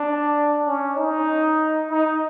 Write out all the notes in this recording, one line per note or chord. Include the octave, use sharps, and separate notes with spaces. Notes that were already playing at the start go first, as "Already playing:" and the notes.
Already playing: D4
C#4
D#4
D#4